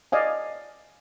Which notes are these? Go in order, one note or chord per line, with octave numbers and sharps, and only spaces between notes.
D5 D#5 F5 G#5